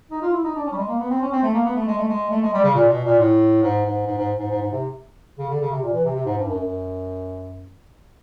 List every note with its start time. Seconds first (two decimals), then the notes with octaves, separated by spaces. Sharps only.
0.11 D#4
0.22 F4
0.33 E4
0.44 D#4
0.55 D4
0.66 C#4
0.72 G3
0.77 G#3
0.88 A#3
0.99 B3
1.10 C4
1.21 C#4
1.32 C4
1.43 A3
1.54 A#3
1.65 B3
1.76 A3
1.87 G#3
1.98 A3
2.08 G#3
2.31 A3
2.42 G#3
2.53 G3
2.64 C#3
2.75 A#2
2.89 B2
3.04 A#2
3.19 A2
3.63 G#2
3.85 G#2
4.06 G#2
4.17 G#2
4.39 G#2
4.50 G#2
4.61 G#2
4.72 C3
5.38 C#3
5.50 D3
5.61 C#3
5.71 C3
5.82 A#2
5.93 E3
6.04 C3
6.15 C3
6.26 G#2
6.37 G2
6.48 F#2
6.59 F#2